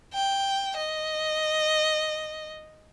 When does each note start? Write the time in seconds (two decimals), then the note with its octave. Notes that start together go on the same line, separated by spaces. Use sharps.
0.14 G5
0.77 D#5